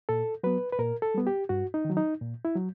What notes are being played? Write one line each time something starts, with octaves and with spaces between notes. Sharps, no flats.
A#2 A4
F#3 B3 B4
B4
A#2 A#4
A4
G3 B3
G4
G2 F#4
D#4
D#3 F#3
D#4
A#2
E4
F#3